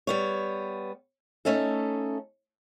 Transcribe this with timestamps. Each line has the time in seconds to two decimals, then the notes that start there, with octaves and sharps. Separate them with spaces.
0.07 G3 B3 C#5
1.45 A3 C#4 D#4 A4